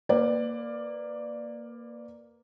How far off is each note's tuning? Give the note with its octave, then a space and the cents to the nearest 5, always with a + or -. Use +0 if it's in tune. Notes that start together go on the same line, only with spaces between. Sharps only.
A#3 +0 B4 +25 D5 +10